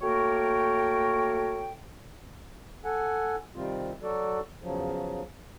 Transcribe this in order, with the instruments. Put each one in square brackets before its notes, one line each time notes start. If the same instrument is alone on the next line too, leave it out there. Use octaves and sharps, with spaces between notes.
[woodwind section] A3 A#3 F#4 A#4 C#5 G5
[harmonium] A4 F#5 G#5
C3 D#3 G3 C4 F4
F#3 F#4 A4 D5
E2 C#3 F3 F#3